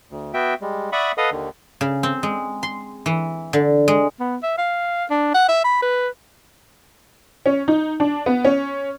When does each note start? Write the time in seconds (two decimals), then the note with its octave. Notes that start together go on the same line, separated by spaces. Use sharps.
0.11 D2
0.34 B3 F#4 E5 G5
0.61 G3 G#3
0.92 D5 E5 F#5 B5 C#6 D#6
1.17 A4 B4 D#5 F5 F#5 D#6
1.31 D#2 D3 D#3
1.81 C#3
2.03 C4
2.23 G#3
2.63 C6
3.06 E3
3.53 D3
3.88 G#3
4.20 B3
4.43 E5
4.58 F5
5.10 D4
5.34 F#5
5.48 E5
5.64 B5
5.82 B4
7.46 C#4
7.68 D#4
8.00 D4
8.26 B3
8.45 C#4